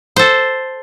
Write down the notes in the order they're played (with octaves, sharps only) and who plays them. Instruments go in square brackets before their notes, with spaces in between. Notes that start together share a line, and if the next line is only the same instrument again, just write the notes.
[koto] A4 C5